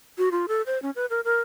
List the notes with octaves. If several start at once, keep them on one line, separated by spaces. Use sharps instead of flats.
F#4
F4
A4
C5
C#4
B4
A#4
A#4